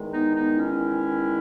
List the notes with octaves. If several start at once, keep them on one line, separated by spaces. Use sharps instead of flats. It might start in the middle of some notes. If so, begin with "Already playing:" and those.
Already playing: E2 D#3 G#3
B3 D#4
B3 D#4
C#4 E4